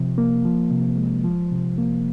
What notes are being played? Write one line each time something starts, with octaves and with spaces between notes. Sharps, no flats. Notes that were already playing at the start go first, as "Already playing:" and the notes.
Already playing: C3 F3
A#3
F3
C3
G#3
F3
C3
A#3